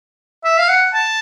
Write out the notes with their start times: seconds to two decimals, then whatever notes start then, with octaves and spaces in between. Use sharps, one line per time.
0.44 E5
0.58 F5
0.69 F#5
0.94 A5